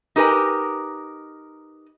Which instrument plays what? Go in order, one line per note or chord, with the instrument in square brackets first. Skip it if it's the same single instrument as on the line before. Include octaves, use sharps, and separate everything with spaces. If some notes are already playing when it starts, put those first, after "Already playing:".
[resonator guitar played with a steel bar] D#4 G4 A#4 B4 G#5